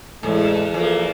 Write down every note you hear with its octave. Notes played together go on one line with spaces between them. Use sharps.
E2 A2 G#3 A4
E2 F3 A#3 A4